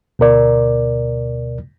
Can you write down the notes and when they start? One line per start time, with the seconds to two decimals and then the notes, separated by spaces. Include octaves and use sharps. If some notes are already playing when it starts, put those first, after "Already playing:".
0.19 D2 B2 A#4 D5